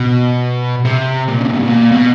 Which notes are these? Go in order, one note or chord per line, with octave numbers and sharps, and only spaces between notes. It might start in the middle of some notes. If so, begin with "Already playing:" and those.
Already playing: B2
C3
A#2
C#3
C3
B2
A#2
B2